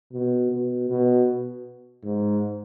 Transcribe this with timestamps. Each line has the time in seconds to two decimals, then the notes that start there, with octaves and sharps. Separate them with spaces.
0.13 B2
0.51 B2
0.90 B2
2.04 G#2